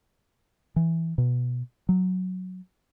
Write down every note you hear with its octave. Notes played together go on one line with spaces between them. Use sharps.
E3
B2
F#3